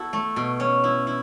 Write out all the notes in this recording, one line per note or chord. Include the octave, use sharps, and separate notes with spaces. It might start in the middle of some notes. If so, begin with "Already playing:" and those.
Already playing: B3 E4 F#4 A4
A3
B2
C#4
E4
E4